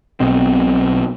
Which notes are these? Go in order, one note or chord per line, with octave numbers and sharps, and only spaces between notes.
B1 B2 C4